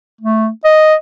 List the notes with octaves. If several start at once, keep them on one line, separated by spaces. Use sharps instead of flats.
A3
D#5